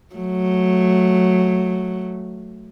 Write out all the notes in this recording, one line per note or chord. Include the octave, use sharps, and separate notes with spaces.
F#3 A3